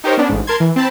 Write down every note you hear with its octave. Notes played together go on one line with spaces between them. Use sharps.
D#4 G4 A#4 C5 C#5
B3 C#4 D4
A1 G#2
A#4 A5 C6 G#6
E3
C4 A5 B5